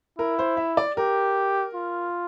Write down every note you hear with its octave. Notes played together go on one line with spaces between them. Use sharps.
E4 A#4
C5
E5
D5
G4 A#4
F4